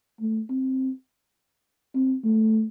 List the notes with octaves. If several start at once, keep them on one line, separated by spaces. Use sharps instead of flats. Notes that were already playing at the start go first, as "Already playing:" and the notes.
A3
C4
C4
A3